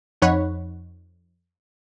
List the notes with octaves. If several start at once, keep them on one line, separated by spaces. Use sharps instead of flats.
F2 D#4 C#5 F#5 B5